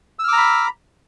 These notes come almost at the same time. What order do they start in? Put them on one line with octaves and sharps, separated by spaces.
E6 F6 D6 A#5 B5